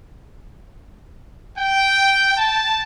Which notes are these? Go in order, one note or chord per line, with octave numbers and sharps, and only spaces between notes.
G5
A5